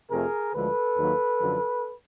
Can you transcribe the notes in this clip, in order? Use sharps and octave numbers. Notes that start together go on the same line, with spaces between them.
F2 C3 F3 A3 G#4 A#4
D2 D3 F3 G#3 A4 B4
D#2 D#3 F#3 A#3
F#2 D3 F3